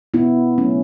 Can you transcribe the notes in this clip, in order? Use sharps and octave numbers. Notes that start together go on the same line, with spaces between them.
B2 B3 E4
F#3 A3 C#4